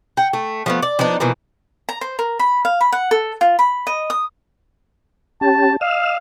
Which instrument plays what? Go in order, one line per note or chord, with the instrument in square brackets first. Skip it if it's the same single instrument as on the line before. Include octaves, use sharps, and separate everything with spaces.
[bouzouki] F#5 G5
A3
F3 A3 B3
D5
F3 B3 D4 D#4
B2 E3 F3 A#3
[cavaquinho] A#5
C5
A#4
B5
F5
B5
F#5
A4
F4
B5
D#5
D#6
[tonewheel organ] C#4 G4 [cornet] A5
[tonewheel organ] D#5 E6 F6 [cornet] F5